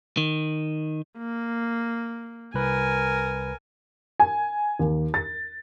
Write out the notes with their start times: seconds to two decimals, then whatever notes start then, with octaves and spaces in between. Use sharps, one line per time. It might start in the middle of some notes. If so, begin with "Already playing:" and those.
0.17 D#3
1.18 A#3
2.54 C2 A#4 B4 G#5
4.20 G#5
4.79 D#2
5.14 A6